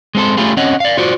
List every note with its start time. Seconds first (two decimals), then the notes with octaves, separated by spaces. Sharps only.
0.15 G#3 C4 A4 C5
0.37 A3 C#4 E4 F4 G4 G#4
0.57 C4 C#4 C#5 D#5 F#5
0.80 D5 F5
0.97 F4 F#4 C5 D5